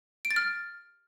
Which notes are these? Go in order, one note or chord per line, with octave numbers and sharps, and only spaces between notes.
D7
A6
F6